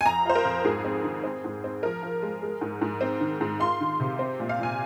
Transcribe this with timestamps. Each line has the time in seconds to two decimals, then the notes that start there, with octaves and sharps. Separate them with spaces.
0.01 G#5
0.06 F2 A#5
0.26 F4 C5
0.35 A#4
0.45 F2
0.64 G#2 G#4
0.85 C4
1.04 D#3
1.24 C4
1.44 G#2
1.64 C4
1.83 F3 A#4
2.03 F3
2.22 G#3
2.42 G#3
2.61 G#2
2.81 G#2
3.01 C4
3.21 D#3
3.41 G#2
3.60 F4 C6
3.81 D#3
4.00 C3
4.19 C4
4.40 A#2
4.49 F5
4.59 A#2 G#5